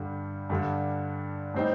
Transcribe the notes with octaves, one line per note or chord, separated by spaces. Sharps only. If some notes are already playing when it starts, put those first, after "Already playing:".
Already playing: G2 D3 G3
G2 D3 G3
A2 G3 C4 D#4